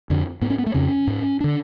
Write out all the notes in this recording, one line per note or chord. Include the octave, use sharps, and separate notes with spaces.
F2 D3
G#2 B3
C#4
B3
A3
F2 C#3 C#4
G#2
D3 D4